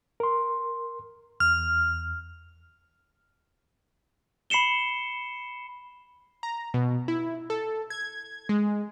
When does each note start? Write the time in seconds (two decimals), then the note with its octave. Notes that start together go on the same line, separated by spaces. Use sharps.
0.20 A#4 C6
1.40 E2 F6
4.50 B5 C7 C#7 E7 G7
6.43 A#5
6.74 B2
7.08 E4
7.50 A4
7.90 G#6
8.49 G#3